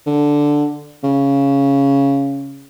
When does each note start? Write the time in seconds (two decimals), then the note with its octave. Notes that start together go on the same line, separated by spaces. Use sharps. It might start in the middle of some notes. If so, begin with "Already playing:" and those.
0.06 D3
1.03 C#3